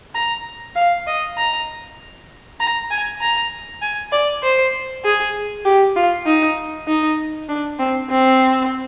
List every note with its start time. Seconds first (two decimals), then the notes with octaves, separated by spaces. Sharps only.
0.15 A#5
0.75 F5
1.07 D#5
1.38 A#5
2.60 A#5
2.91 G#5
3.21 A#5
3.82 G#5
4.12 D5
4.43 C5
5.04 G#4
5.65 G4
5.96 F4
6.26 D#4
6.87 D#4
7.49 D4
7.79 C4
8.10 C4